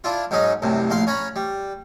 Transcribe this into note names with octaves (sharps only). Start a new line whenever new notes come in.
D4 E4 F4
G#2 F#3 C#4 D#4
C2 F#2 A2 C3
A#1 A2 F5 C6
C#4 C#5 A#5 B5
G3